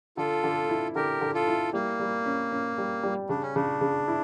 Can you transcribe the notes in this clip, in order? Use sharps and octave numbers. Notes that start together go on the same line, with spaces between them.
D3 F4 A4
D3
E4
D3 G4 A#4
D3
F4 A4
E4
G3 A#3
G3
C#4
C#4
G3
G3
C#3 D4
C#4
C#3 D4
C#3
E4